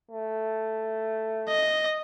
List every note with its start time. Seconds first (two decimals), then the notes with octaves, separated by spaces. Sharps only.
0.11 A3
1.48 D#5